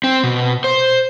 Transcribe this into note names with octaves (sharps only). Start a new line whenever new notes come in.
C4
B2
C5